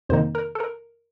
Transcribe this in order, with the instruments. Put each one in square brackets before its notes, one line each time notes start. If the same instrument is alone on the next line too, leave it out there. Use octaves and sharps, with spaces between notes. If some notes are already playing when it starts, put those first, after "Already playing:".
[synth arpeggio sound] F2 C3 D#3 A#3 D#4 C5
A#4
A4
A#4